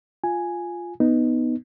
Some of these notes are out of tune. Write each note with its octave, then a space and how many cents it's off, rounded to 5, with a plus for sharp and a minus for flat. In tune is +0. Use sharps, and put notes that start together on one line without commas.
F4 +0 G#5 +0
B3 +0 D#4 +0